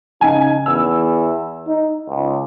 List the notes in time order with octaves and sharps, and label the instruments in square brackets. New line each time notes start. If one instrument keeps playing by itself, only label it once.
[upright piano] C#3 G#5 [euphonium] D#4
[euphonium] E2 [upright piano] E6
[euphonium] D#4
C#2